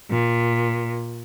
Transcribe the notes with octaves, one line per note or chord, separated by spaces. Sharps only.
A#2